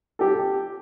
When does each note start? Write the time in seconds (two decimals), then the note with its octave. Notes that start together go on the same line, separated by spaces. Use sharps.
0.19 G4 A4